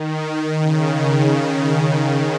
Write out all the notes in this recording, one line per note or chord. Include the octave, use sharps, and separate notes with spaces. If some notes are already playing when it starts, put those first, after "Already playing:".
Already playing: D#3
C#3